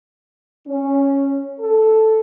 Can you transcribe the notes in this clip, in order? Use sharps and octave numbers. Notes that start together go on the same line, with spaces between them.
C#4
A4